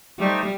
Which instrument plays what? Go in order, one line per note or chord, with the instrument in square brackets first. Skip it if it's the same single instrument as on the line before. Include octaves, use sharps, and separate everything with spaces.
[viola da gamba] G3 [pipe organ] A3 D#4 G4 C5